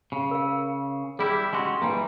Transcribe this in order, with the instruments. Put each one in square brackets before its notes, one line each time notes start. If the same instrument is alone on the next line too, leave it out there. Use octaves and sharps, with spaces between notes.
[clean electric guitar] C#3
[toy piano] A#4 F5
[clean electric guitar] G3 E4 G4 [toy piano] G#4
[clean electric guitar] G#3 C#4 F#4 [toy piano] G5 C6
[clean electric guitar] E3 G3 A#3